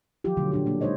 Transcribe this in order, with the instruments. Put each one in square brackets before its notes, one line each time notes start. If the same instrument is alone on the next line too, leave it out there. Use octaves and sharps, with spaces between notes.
[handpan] D#3 F3 F#3 F4 G4
B2 D3 F3 F#3 A3
A#2 D4 G4
A#3 D4
G#3 D#4 C5 C#5 D#5